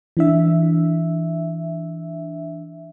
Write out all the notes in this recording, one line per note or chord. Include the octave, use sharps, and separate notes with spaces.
E3 D4 E5